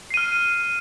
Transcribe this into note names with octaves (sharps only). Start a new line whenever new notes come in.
F6 C7 D#7